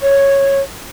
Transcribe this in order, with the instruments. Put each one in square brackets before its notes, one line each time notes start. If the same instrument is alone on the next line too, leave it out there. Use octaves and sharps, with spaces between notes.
[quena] C#5